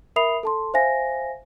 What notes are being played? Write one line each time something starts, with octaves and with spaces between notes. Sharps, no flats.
A#4 E5 B5 D#6 C7 F7
A4 A5 C6
C5 E5 F5 G#5 A#6